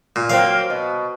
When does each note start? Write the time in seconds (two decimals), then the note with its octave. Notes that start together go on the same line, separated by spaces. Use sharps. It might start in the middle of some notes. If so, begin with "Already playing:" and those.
0.16 A#2
0.29 F#3 A#3 C4 F5
0.70 B2